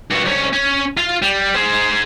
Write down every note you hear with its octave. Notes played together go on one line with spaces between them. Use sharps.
G2 F#4
C2 C#4
C#4
F4 F5
G3
G#4 C5